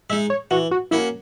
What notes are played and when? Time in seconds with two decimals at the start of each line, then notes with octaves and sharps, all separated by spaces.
0.10 G#3 E5
0.13 D#4
0.30 C#5
0.51 E3 F#4
0.71 F#4
0.91 A#3 C#4 E4 F#4